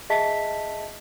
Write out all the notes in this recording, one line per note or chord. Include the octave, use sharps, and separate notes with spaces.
G#4 D#5 E5 A5 B6